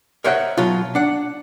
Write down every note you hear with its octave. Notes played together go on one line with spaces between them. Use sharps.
A#4 C5 C#5 D#5 E5 F#5
B2 F#3 F4
D4 F#5